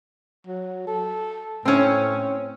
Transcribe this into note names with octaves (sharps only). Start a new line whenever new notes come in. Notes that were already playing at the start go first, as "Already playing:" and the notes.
F#3
A4
A2 C4 C#4